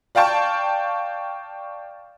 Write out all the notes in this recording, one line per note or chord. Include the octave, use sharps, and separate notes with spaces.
D5 F5 G5 A5 C#6